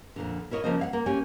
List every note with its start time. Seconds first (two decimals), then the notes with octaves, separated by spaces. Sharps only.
0.16 F2 A#2 D3
0.51 E4 A#4 C#5 D#5
0.64 C#3 F3 A#3 C5 D#5
0.79 C#5 F5 F#5
0.93 A#3
1.06 A#3 C#4 G4 C#5 G#5